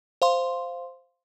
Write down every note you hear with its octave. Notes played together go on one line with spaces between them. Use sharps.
C5 F5 C6